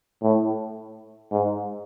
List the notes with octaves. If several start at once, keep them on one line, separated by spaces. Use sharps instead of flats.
A2
G#2